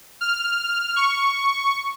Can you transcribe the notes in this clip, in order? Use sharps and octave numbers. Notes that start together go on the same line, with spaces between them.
F6
C#6